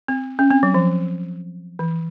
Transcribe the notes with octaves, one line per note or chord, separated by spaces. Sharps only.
C4
C#4
C4
F#3
F3
E3